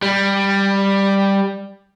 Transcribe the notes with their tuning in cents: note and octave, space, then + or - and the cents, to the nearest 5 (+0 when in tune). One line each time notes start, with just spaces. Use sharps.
G3 +5